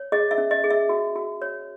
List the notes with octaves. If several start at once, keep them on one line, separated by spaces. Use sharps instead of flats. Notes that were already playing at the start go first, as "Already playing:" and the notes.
Already playing: C#5
G#4 D#5
E5
C#4
D#5
G#4
E5
F#4
F#4
C#5